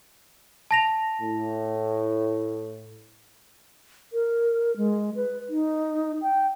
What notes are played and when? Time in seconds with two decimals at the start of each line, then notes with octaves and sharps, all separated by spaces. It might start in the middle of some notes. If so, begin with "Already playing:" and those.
0.71 A5 A#6 F7
1.22 A2
4.13 A#4
4.77 G#3
5.15 B4
5.49 D#4
6.22 G5